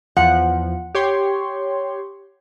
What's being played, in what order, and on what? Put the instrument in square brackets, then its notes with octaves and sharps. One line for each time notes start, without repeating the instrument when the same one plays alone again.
[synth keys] E2 F3 [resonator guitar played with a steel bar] F#5
[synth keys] G4 C#5 C6